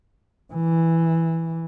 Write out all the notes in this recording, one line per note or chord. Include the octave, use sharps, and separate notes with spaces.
E3